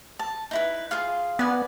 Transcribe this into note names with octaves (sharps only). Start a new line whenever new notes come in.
A5
D#4 E4 B4
F4 G#4 F5
B3 D5 G#5